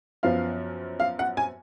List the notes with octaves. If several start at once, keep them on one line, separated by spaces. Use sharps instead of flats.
F#2 F3 B3 F5
F5
F#5
G#5